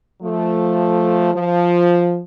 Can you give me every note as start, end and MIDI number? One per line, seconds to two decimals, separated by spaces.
0.22 1.31 53
0.22 1.31 57
1.34 2.22 53